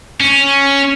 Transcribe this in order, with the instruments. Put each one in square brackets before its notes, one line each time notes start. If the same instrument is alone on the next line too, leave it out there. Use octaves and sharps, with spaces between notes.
[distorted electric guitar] C#4